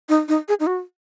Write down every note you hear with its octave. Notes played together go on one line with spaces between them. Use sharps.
D#4
D#4
G#4
D#4
F#4